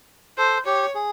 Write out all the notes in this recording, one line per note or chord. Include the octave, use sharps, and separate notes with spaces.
A4 C5
G4 C#5
G#4